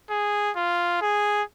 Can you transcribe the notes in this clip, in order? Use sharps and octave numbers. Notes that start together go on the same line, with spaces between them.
G#4
F4
G#4